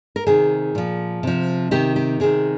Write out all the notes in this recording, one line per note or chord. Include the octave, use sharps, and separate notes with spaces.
A#4
C3 D#3 G#4
A#2 F3
C3 F3
C3 D#3 G4
G4
C3 D#3 G#4